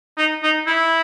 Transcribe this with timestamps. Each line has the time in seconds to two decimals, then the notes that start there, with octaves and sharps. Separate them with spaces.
0.18 D#4
0.43 D#4
0.67 E4